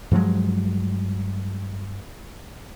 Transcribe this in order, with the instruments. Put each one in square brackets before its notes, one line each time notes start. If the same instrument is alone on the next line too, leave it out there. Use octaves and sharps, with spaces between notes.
[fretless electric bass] G2 F3 F#3 G#3